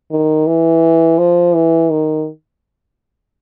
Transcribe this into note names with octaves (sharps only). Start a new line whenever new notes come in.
D#3
E3
F3
E3
D#3